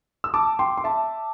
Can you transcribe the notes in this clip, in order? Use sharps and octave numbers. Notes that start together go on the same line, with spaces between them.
E6
A5 D6
G5 C6
C6
E5 A5